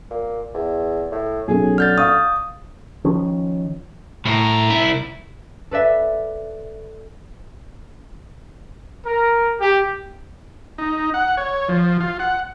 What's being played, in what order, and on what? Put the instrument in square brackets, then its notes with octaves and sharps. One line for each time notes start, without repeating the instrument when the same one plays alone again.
[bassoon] A#2
E2
A2
[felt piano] B1 C#4 A4 [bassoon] G#4
[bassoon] D3 [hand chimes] F6 G6 A6
[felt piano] F5 C#6 [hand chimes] D#6
[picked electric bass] D#3 F3 C#4
[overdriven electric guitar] C2 A#5 [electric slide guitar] A2
[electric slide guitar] E4
[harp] A4 B4 D5 E5
[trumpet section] A#4
G4
[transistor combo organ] D#4
F#5
C#5
F3
F4
F#5